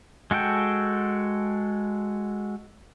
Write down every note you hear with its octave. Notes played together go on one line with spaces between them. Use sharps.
G#3 F#4 A4 G5